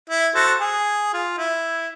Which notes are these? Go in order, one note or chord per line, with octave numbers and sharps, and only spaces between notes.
E4
F#4 A4 C5
G#4
F4
E4